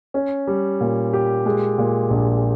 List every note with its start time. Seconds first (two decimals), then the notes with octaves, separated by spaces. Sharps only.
0.14 C#4
0.47 G3
0.81 A#2
1.13 G4
1.46 G#3
1.78 A#2
2.10 A#1